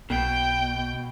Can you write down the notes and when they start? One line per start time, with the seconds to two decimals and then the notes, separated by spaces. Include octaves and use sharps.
0.10 B1 B2 G5